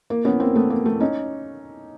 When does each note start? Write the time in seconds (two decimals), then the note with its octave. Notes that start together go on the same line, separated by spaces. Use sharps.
0.10 A#3
0.25 B3 C#4
0.40 A#3 C4
0.55 A3 B3
0.70 A#3
0.86 A3
1.00 C#4 D#4